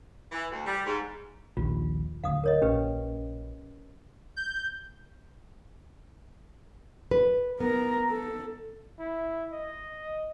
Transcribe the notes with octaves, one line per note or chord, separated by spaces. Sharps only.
E3
D2
G3
G#2
A#1 D#2 F4
D1 D2 F5 D#6
A#4 C#5 D#5
A#1 C#4 G4 B4
G6
B4
B3 A#4 A#5
A4
E4
D#5